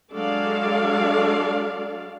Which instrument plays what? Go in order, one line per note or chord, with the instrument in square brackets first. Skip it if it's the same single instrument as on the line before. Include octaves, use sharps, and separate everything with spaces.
[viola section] F#3 G#3 D4 A4 D5 F5